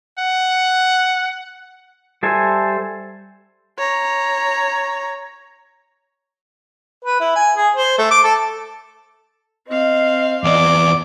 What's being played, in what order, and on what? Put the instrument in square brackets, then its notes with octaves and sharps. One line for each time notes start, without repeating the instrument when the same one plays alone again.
[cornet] F#5
[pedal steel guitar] G3 A4 C5 E5 G#5
[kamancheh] C#5 A#5
[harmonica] B4
E4
G#5
G#4
C5
A3
D6
A4
[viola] C4 F5 [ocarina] D#5
[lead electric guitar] E2 D5 [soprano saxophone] D6